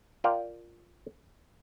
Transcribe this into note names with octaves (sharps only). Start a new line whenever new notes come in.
F4 A#4 D5 F5 G5